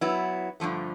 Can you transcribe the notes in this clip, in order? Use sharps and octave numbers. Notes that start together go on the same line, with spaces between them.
F#3 B3 E4
G2 D3 F3 A3